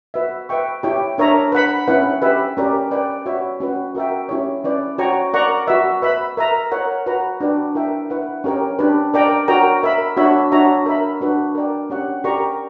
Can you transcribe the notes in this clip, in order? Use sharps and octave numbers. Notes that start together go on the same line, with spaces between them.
F#4 B4 E5
B4 E5 G5 C#6
E4 G4 C#5 G5
D4 A#4 C#5 E5 A#5
B4 F#5 B5
C#4 E4 B4 F#5
G4 B4 E5
C#4 G4 A#4 D5
B4 D5 G5
F#4 C#5 E5 B5
C#4 F#4 B4
F#4 A#4 E5 G5
C#4 E4 G4 C#5
C#4 E4 B4 D5
F#4 C#5 G5 A#5 C#6
A#4 D5 F#5 A#5 C#6
F#4 B4 E5
B4 E5 B5
A#4 E5 A#5
A#4 C#5 F#5
F#4 B4 F#5 A#5
D4 F#4 B4 D5 G5
E4 A#4 E5 G5
E4 B4 F#5
C#4 G4 A#4 C#5 G5
D4 G4 B4
A#4 D5 G5 A#5
F#4 A#4 C#5 G5 A#5
A#4 E5 B5
D4 F#4 C#5 E5 B5
D4 F#4 C#5 E5 A#5
A#4 E5 B5
D4 F#4 B4
A#4 D5 G5
C#4 G4 C#5 F#5
G4 A#4 D5 A#5 C#6